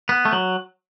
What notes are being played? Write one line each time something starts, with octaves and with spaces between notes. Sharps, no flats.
B3
A3
F#3